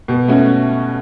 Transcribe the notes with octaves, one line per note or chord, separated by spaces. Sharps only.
B2
A3 C#4 F#4